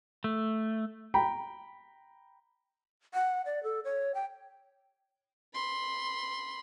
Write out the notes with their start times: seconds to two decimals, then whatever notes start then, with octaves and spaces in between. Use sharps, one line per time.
0.24 A3
1.14 G5 A#5 B5
3.14 F#5
3.46 D5
3.63 A4
3.85 C#5
4.15 G5
5.54 B5 C6